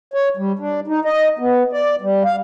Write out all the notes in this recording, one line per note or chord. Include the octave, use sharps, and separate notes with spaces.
C#5
G3
D4
D#4
D#5
B3
D5
G3
F5